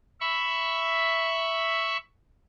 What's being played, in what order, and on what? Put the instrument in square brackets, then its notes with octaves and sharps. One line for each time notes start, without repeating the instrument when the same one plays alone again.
[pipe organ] E5 B5 C#6